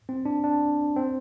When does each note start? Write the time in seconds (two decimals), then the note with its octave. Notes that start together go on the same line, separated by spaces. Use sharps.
0.09 C4
0.25 D4
0.44 D4
0.96 C4